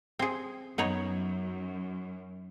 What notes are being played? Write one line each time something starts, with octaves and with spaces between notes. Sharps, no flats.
C4 G#4
F#2 B3 D#4 C#5